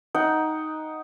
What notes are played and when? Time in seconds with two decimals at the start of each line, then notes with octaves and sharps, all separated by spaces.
0.15 D#4 F#5 G5